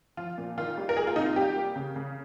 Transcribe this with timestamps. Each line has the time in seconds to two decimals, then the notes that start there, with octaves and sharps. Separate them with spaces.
0.17 F3 F4
0.38 A#2
0.58 D#3 F4
0.77 G3
0.89 A#4
0.97 A#3 G#4
1.07 F4
1.16 C3 D#4
1.26 F4
1.36 G3 G4
1.55 A#3
1.76 C#3
1.96 C#3